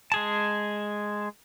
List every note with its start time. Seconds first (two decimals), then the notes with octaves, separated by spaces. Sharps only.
0.12 G#3 G#4 A5